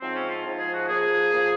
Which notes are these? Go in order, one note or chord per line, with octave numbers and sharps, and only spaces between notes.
G#2 F3 C4
C#4
F4
G#2 F3
G#4
F#4
A#2 F3 G#4
A#2 F3